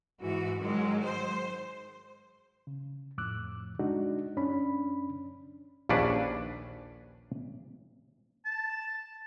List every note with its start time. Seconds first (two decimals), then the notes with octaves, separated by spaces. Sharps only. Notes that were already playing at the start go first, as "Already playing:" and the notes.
0.20 G#2 E3 F#4
0.59 G#2 D#3 F#3 G#3
1.03 C5
2.67 C#3
3.18 F2 A2 D6 E6 F#6
3.79 G#3 D4 D#4 F#4
4.37 F#2 C#4 D4 B5
5.89 A#1 D#2 C#4 D4 B4
8.45 A5